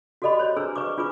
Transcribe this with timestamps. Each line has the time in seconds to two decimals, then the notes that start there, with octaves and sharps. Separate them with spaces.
0.22 F#4 G4 A4 D5 D#5 B5
0.39 C5 C#5
0.56 D4 G#4 B4 A#5 E6
0.76 B4 D5 C#6 D6
0.97 D4 F4 G#4 B4 D6